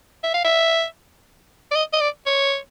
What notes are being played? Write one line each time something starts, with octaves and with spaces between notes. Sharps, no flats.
E5
F5
E5
D5
D#5
D#5
D5
C#5